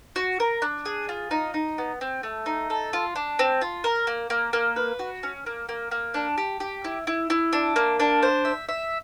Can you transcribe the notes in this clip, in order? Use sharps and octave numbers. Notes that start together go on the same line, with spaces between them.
F#4
A#4
D4
G#4
F4
D#4
D#4
B3
C4
A3
D#4
A4
F4
D4
C4
F4
A#4
A#3
A#3
A#3
B4
F#4
C#4
A#3
A#3
A#3
D4
G4
G4
E4
E4
E4
D4
A#3
D4
C5
E5
E5